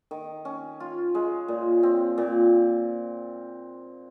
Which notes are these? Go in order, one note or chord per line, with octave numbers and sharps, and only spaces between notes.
D#3
C#4
F4
G#3
A#2
C4
A#2